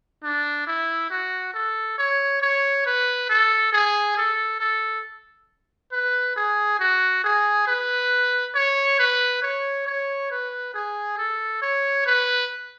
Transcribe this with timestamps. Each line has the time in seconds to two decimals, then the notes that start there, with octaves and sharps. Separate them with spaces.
0.24 D4
0.67 E4
1.11 F#4
1.54 A4
1.98 C#5
2.42 C#5
2.86 B4
3.30 A4
3.73 G#4
4.17 A4
4.61 A4
5.93 B4
6.36 G#4
6.80 F#4
7.24 G#4
7.68 B4
8.55 C#5
8.99 B4
9.43 C#5
9.87 C#5
10.31 B4
10.75 G#4
11.18 A4
11.62 C#5
12.06 B4